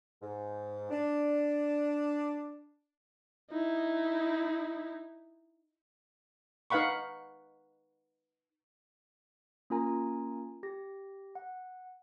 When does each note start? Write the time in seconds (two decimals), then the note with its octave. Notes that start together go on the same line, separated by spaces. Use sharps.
0.22 G#2
0.91 D4
3.51 D#4 E4
6.70 D#4 B4 F5 F#5 B5 C#6
9.70 A#3 C#4 F4 A#4 G#5 A#5
10.63 G4 A#6
11.35 F#5